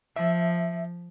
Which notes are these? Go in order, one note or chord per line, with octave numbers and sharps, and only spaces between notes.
F3 E5